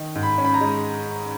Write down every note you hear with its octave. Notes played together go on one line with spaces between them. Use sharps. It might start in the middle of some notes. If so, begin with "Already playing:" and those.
Already playing: D#3
G#2
B5
C#4
B5
A#5
G#3